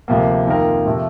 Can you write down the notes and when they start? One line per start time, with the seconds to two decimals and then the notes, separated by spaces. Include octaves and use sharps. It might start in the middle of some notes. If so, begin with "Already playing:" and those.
0.08 D2 C3 F3 A#3
0.47 F2 D#3 A#3 F4 A#4
0.86 C3 F3 A3